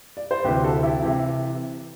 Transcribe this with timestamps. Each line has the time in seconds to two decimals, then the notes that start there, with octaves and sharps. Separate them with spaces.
0.17 D5
0.31 C5
0.44 D2 C3 E3 G4 B4
0.64 F#4 A4
0.83 E4 G4
1.02 C3 E3 E4 G4